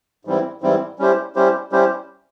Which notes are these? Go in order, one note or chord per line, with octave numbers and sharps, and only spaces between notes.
G#2 E3 G3 C4 E4
G#2 E3 G3 C4 E4
G3 C#4 E4 G4 C5
G3 C#4 E4 G4 C5
G3 C#4 E4 G4 C5